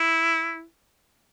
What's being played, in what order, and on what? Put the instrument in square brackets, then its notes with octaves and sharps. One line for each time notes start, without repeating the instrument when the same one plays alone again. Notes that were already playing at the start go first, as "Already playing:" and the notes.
Already playing: [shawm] E4